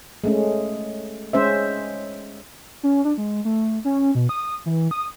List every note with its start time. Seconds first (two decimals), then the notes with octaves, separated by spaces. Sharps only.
0.24 G#3 A3 C#4
1.33 G#3 C#4 C5 E5
2.83 C#4
3.05 D4
3.18 G#3
3.45 A3
3.85 C#4
4.15 B2
4.29 D#6
4.66 E3
4.91 D#6